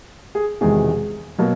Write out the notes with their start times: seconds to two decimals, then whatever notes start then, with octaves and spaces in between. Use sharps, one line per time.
0.35 G#4
0.61 E1 E2 C3 D#3 G#3 G#4
1.38 B2 F#3 A#3